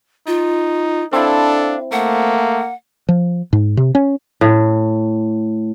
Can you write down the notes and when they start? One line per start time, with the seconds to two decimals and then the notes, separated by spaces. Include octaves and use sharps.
0.27 D#4 F4
1.13 C4 D4 E4 A4 F5
1.92 A3 A#3 F#5
3.09 F3
3.53 G#2
3.77 C3
3.95 C#4
4.41 A2